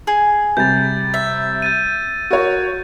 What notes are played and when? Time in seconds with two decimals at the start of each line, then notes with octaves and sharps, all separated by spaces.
0.07 G#4
0.57 C3 G3 G6 A6
1.14 E5
1.62 G6 A6 D#7
2.31 F#4 A#4 C#5